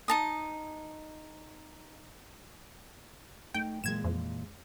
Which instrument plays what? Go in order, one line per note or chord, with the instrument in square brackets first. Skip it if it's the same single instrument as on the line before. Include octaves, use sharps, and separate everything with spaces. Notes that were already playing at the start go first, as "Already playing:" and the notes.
[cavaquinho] D#4 A5 D#6
[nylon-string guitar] A3 D#4 [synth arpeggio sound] G5
[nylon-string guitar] A#2 E3 G#3 [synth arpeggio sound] G#6 E7
[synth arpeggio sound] F2